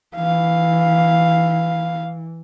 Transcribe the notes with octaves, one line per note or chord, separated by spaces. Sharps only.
E3 F5